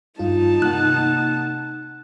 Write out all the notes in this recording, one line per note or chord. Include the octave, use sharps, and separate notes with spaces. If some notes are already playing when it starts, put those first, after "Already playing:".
G2 D#4 F4 A5
C3 A#3 F#5 F#6